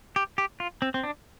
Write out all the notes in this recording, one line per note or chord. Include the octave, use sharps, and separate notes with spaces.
G4
G4
F4
C4
C4
D4